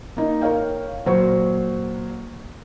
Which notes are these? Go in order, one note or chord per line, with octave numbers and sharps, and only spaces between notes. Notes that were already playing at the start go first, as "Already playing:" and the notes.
A#3 D#4
A#4 C#5 F5 G5
A#2 F#3 C5 C#6